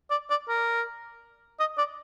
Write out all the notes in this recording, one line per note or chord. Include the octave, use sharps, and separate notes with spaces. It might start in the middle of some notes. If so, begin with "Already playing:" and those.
D5
D5
A#4
D#5
D5